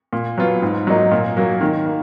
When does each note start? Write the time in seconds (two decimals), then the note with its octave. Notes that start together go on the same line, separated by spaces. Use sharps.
0.13 A#2
0.38 F#3 B3 F4
0.62 G#2
0.87 F#3 A#3 D#4
1.11 A#2
1.37 F#3 A#3
1.61 D#3
1.86 A#3